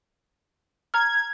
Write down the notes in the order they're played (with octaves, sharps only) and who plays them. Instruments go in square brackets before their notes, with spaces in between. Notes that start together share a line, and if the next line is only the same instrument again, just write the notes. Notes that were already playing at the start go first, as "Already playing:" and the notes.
[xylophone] A#5 F6 [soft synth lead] G#6